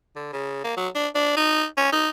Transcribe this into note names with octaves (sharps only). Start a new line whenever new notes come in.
D3
C#3
A#3
F#3
D4
D4
D#4
C#4
D#4